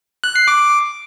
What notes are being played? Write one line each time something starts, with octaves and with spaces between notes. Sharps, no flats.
F#6
C7
D6